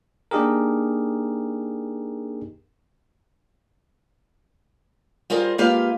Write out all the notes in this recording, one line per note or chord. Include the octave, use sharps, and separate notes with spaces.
A#3 D4 D#4 G4 G#4 A#4
G3 F4 G#4 A#4 C5
G#3 A#3 F4 G4 B4 F5